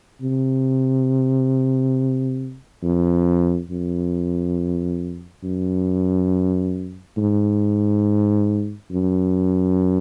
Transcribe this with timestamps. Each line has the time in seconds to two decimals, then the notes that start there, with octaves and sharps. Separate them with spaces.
0.21 C3
2.83 F2
3.70 F2
5.43 F#2
7.18 G#2
8.92 F#2